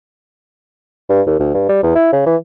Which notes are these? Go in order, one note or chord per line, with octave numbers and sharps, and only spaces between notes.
G2
D#2
D2
G2
G3
E2
E4
C#3
E3